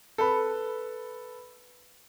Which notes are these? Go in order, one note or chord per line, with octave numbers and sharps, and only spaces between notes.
A4 B4 B5